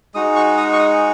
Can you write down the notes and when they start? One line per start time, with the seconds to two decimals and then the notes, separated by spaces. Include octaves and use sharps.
0.14 G#3 D#4 F#4 D#6
0.36 C#6
0.57 D#6
0.73 C#6
0.79 D#6